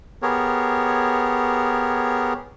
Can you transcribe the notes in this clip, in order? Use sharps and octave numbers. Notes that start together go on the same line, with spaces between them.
B3 G4 G#4 A#4 C#5